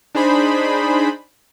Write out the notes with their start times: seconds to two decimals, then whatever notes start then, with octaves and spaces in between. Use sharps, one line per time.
0.15 D4 D#4 G#4 C5 B5